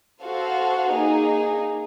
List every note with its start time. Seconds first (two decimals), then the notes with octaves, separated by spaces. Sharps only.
0.22 F#4 A4 C5 F5
0.92 A#3 D#4 G#4